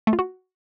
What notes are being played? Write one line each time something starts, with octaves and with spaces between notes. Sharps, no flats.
A3
F4
F#4